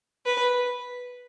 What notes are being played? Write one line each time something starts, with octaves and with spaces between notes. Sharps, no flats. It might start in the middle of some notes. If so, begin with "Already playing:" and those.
B4